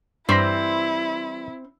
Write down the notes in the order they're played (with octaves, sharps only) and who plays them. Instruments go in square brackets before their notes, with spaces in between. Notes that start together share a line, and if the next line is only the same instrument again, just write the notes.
[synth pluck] G2 C6 A#6 [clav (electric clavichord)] E3 G3 C5 [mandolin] C4 [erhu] E4